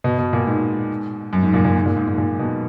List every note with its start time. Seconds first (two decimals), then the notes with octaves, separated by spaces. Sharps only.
0.04 B2
0.19 B2
0.33 A#2
0.47 G#2
1.33 F#2
1.43 G#2
1.54 A#2
1.65 A#2
1.75 G#2
1.86 A#2
1.97 G#2
2.07 G#2
2.18 A#2
2.39 B2